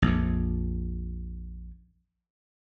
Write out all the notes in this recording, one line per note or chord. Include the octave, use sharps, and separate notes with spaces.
A#1 F2